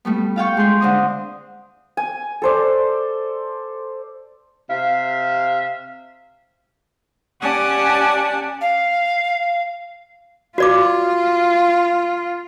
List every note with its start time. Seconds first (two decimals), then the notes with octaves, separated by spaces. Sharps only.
0.05 G3 A3 B3
0.36 F4 F5 G5 C#6
0.57 G#3 G#4 C6 G6
0.80 D3 C4 D#6
1.97 G#5
2.42 A4 C5 D5
4.70 C3 E5 F5
7.41 C#4 G4 D5 F#5 G#5 A5
8.61 F5
10.58 F4 F#4 D5 D6